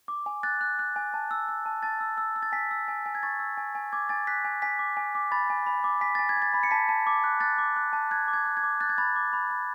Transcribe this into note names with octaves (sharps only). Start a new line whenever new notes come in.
D6
G#5
F#6 A6
F#6
F#6
G#5
A5
E6
E6
A5
A5 A6
E6
E6
E6
A6
G#5 B6
E6
G#5
G#5
G#6
C#6 A6
E6
G#5
G#5
D6 G#6
G#5 A6
F#6 B6
G#5
G#5 B6
D6
G#5
D6
B5 A6
G#5
B5
D6
G#5 B6
G#5 A6
G#6
G#5
A6
B5
C#7
A5 B6
A5
D6
F#6
F#6 A6
D6
F#6
A5
F#6 G#6
D6
G#6
F#6
G#6
D6
F#6 A6
G#6
B5 A6
D6
B5
B5